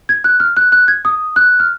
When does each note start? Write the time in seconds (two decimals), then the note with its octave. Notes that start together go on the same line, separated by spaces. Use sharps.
0.09 G#6
0.24 F#6
0.40 F6
0.57 F#6
0.72 F#6
0.88 G#6
1.05 D#6
1.36 F#6
1.60 F6